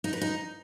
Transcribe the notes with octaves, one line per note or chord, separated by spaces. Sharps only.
D#4
B4
D#4